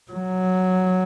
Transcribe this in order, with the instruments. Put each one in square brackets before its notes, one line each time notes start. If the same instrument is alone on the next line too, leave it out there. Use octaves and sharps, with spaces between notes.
[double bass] F#3